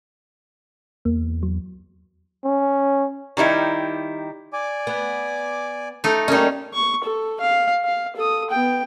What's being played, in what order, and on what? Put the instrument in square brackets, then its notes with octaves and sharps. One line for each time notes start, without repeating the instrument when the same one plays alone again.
[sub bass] E2 [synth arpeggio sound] A#3
[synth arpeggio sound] F#3
[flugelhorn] C#4
[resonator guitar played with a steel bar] D#3 G3 D#4 E4
[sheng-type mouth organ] D5 G#5 D6
[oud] B3
[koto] A3 D#4
[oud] G3 A#3 D#5 [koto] C#4 D#4
[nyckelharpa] C#6
A4
F5
F5
A4 D#6
B3 G5